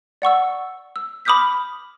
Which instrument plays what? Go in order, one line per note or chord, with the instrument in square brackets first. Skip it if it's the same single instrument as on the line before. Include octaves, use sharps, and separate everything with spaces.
[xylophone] D5 F#5 C#6 E6
E6
B5 D6 D#6 F6 G6 B6